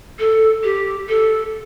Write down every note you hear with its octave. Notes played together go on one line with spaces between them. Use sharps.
A4
G4
A4